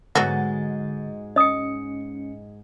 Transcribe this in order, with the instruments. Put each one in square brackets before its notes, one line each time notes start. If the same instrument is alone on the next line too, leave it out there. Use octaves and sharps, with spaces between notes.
[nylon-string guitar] G#2 G#3 G#5 [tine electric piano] D3 A6 [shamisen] F#3 B3 F#4
[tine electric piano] C#4 C#7 [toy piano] D#5 D#6